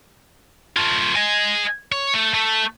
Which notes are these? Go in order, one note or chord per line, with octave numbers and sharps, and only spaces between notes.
A3 F4
D#5 G#5
C#5
A3
A3